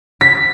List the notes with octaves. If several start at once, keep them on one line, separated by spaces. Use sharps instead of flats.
B6